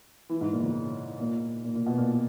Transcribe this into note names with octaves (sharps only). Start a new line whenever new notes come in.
E3
G#2
A#2
C#3
A#2
A#2
A#2
B2
A#2